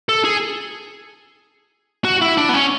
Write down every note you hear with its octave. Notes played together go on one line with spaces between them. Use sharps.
A4
G#4
F#4
E4
D4
B3
C#4